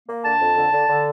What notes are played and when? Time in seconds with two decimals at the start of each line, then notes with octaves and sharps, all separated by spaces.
0.09 A#3
0.25 D3 A5
0.40 F2
0.57 D3
0.73 D3
0.89 D3